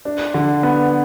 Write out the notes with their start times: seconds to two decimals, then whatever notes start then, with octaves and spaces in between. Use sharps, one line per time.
0.05 D4
0.34 D3
0.63 B3